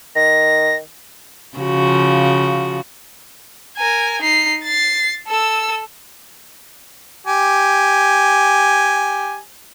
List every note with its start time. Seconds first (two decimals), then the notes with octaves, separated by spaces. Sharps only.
0.16 D#3 A#6
1.57 C#3 F3 F#4
3.77 A#4 G#5
4.22 D#4 C7
4.63 A6 C7
5.28 A4 E6
7.27 G4 G#5